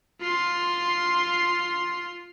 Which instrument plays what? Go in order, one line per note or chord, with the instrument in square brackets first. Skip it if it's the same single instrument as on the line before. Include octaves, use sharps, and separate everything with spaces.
[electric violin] F4 C6